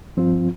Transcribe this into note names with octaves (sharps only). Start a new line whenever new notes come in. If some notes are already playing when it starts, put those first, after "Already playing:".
G2 F3 C4 F4